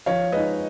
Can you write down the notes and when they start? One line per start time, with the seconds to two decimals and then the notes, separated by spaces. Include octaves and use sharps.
0.06 F3 C#5 F5
0.32 G#3 D#4 B4 D#5